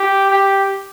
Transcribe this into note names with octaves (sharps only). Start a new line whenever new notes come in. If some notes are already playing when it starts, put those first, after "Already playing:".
Already playing: G4
G4